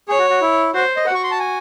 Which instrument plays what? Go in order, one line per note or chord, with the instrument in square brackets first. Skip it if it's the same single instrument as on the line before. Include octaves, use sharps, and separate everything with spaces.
[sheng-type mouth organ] G#4 [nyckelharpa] C#5
[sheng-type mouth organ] F#4
F#4
E4
[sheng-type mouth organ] F#4 [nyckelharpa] C5
[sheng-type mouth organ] D#5
[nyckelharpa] F#4 [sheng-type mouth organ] F#5
[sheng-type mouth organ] C#6
C6
A5
G#5